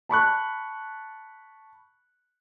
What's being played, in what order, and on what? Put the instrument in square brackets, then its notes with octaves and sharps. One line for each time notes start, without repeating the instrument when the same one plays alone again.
[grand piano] A5 B5 C#6 F#6